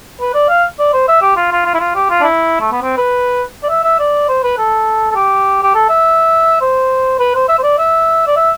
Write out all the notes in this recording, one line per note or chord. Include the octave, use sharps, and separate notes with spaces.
B4
D5
F5
D5
C5
E5
G4
F4
F4
F4
E4
F4
G4
F4
D4
E4
A3
B3
C4
B4
D5
E5
E5
D5
C5
B4
A4
A4
G4
G4
A4
E5
C5
B4
C5
E5
C5
D5
E5
D5
E5